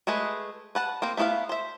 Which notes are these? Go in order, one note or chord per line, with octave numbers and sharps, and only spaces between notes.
G#3 A3 G#4 B4
B4 F#5 A5
A#3 C4 C5
A3 B3 E4 C#5 F5
C5 E5